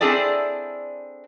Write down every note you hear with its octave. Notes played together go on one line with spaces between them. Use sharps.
C4 D4 E4 G#4 A4 D5